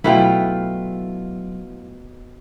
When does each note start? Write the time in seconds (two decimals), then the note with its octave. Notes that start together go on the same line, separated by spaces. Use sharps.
0.04 B2 F#3 A3 E4 F4 G5